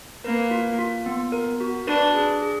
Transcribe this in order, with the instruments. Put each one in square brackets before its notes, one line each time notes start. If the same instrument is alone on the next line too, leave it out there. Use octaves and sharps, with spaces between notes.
[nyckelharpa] A#3 [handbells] B4
[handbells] F4
F4
B3
A#4
F#4
[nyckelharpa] D4 [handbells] B4
[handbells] G#4
G#4